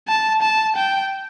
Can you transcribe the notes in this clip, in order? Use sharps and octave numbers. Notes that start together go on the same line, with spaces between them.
A5
A5
G5